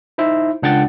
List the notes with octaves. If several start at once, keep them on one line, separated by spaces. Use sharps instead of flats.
D#4 E4 C5 E5
C#2 D4 F#5 G5 A6